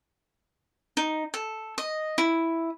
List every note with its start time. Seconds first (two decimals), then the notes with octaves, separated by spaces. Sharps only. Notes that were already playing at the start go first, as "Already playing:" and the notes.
0.97 D#4
1.34 A4
1.78 D#5
2.18 E4